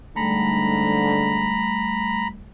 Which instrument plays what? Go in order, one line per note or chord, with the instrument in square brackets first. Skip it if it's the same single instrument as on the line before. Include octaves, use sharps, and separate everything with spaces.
[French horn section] G#2 D3 [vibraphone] G3 A3 [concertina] A#5 B5